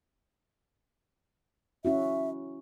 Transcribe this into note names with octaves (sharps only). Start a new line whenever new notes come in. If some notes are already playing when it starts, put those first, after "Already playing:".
C#4 E4 F#4 E5